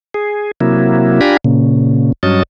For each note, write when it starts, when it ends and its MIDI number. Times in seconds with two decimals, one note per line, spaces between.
0.14 0.51 68
0.61 1.20 48
0.61 1.20 54
0.61 1.20 58
0.61 1.20 64
1.21 1.37 62
1.21 1.37 65
1.21 1.37 67
1.21 1.37 80
1.21 1.37 82
1.21 1.37 83
1.45 2.12 46
1.45 2.12 49
2.23 2.43 43
2.23 2.43 54
2.23 2.43 61
2.23 2.43 75
2.23 2.43 81